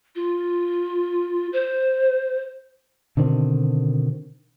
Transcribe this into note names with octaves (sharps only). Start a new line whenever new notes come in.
F4
C5
B2 D3 D#3 C4